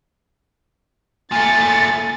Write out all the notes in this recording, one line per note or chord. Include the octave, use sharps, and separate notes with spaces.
A#2 A3 G#5 A6